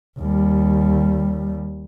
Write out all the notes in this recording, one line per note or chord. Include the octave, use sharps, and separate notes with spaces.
D#2 G3